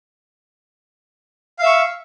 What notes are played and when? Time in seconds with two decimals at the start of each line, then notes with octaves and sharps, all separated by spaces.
1.59 F5
1.62 E5
1.66 C#6